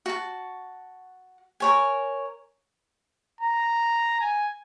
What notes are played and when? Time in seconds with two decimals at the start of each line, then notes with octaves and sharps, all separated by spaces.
0.06 F#4 A5
1.60 A#4 C#5 G#5
3.41 A#5
4.21 G#5